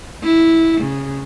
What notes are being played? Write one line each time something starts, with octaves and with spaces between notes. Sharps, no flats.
E4
C#3